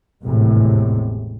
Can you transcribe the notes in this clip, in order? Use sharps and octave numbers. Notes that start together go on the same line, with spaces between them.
G#1 E2 A2 C3 G#3